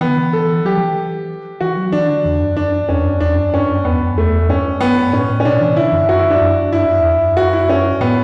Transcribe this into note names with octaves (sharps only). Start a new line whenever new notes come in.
E3 B3
D3
E3
A4
F#3 G4
F#3
E3
E3 F#4
F#3
E3 D4
D3
E2
F#2
D4
E2 C#4
F#2
E2 D4
F#2
G2 C#4
F#2
E2 B3
F#2
E2 A3
G2 C#4
B3
A2 C#4
A2
C#4
B2 D4
E3
D3 E4
F#2
G2
F#2 F#4
E4
D4
F#2
G2 E4
F#2
E2
F#2
F#4
E4
C#4
A2 B3